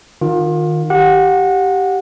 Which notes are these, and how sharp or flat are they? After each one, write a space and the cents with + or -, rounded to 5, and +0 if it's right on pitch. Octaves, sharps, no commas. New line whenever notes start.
D#3 -10 F4 +30
G4 -5 F#5 -25